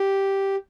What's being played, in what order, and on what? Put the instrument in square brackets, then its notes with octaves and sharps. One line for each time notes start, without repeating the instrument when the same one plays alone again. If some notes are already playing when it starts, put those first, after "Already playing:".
Already playing: [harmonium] G4